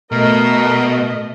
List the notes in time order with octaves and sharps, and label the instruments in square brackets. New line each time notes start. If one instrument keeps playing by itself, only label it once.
[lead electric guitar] B2 [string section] A3 D#5 [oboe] A#4